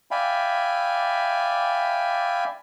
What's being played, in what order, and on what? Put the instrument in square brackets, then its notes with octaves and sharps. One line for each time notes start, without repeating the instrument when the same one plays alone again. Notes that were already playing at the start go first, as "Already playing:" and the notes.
[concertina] D5 E5 F5 G5 G#5 B5